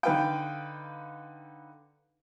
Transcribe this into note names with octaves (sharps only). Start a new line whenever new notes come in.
D3 D#4 B4 F5 G5